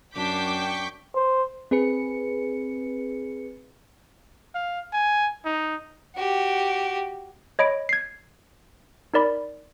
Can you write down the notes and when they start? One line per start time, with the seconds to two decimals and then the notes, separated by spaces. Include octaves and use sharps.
0.15 F#2 D4 G5 C#6 D6 G6 B6
1.15 C5
1.71 C4 G#4 B4 C#7
4.55 F5
4.93 G#5
5.45 D#4
6.15 F#4 G4
7.59 C#5 D#5 B5 D7
7.89 G#6 C7
9.14 D#4 A#4 D5 B5